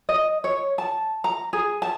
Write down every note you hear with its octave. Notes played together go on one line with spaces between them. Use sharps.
D#5
C#5
A5
A#5
G#4
A5